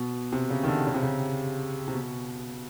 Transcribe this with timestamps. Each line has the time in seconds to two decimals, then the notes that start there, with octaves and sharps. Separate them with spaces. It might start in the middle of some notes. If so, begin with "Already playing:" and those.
Already playing: B2
0.32 C3
0.50 C#3
0.63 D#3
0.68 D3
0.87 C#3
0.94 C3
1.02 C#3
1.88 C3
1.94 B2